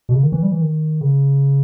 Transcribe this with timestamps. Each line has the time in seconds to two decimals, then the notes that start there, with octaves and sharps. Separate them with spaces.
0.09 B2
0.13 C#3
0.23 D#3
0.32 E3
0.43 G3
0.52 E3
0.61 D#3
1.01 C#3